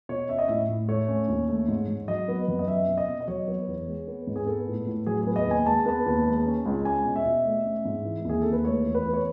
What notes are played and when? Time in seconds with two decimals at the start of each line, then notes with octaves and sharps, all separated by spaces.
0.09 B2 C#5
0.28 C#4 E5
0.39 D#5
0.48 A2 E5
0.69 A2
0.88 A3 C#5
1.08 C#4
1.28 D#2
1.48 A3
1.68 G#2
1.88 G#2
2.08 F#3 D#5
2.28 B3
2.48 F#2
2.59 D#5
2.68 C#4 E5
2.88 B2
2.98 D#5
3.08 B2
3.20 D#5
3.27 F#3 C#5
3.48 B3
3.67 E2
3.86 G#3
4.07 B3
4.27 G#2
4.36 G#4
4.46 B3 A4
4.67 A2
4.87 A2
5.06 F#3 G#4
5.21 G#4
5.27 B3
5.36 D#5
5.46 D#2 G#5
5.66 G#3 A5
5.86 B3 A5
6.06 D#2
6.26 G#3
6.46 C#4
6.66 C#2
6.85 C#4 G#5
7.05 B2
7.16 E5
7.25 B2
7.45 A3
7.64 C#4
7.85 G#2
8.05 E3
8.25 D#2 G#4
8.41 D#2 A4
8.53 B4
8.65 A3 C#5
8.84 E2
8.94 B4
9.04 E2
9.13 C#5